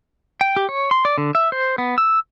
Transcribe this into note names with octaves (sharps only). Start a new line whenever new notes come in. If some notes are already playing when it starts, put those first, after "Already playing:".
G5
G4
C#5
C6
D5
D3
E5
C5
B3
E6